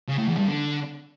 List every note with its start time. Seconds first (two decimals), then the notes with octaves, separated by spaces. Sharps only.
0.09 C#3
0.19 A2
0.28 E2
0.38 G2
0.48 D3